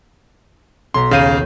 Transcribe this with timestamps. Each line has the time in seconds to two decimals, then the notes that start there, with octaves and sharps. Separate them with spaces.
0.94 B1 A#5 C6 B6
1.11 D#2 C#3 F5 G6 D#7